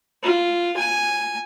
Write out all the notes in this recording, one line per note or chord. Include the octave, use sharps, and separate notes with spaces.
F4
G#5